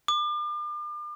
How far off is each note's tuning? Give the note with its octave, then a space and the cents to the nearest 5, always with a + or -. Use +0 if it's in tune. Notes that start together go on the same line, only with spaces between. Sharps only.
D6 +40